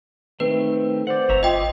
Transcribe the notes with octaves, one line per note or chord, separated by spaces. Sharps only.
D#3 A3 C4 B4
C5 D5 F#5
G1 C#5 E5 A#5
F4 D#5 F5 G5 D6 D#6